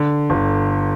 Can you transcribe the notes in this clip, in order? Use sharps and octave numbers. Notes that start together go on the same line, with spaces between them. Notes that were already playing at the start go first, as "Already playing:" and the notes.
Already playing: D3
G1